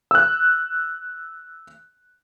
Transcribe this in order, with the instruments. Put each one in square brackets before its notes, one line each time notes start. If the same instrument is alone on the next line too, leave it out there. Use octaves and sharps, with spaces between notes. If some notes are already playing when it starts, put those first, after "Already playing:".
[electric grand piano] E6 F#6